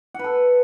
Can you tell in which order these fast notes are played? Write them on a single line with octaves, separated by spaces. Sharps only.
F#5 B4 A4